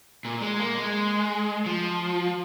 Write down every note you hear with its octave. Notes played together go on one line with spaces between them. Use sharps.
A#2
G#3
A#3
G#3
F3